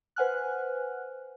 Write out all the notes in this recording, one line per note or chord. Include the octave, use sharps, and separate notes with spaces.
B4 C5 F#5 G#5 F6 F#6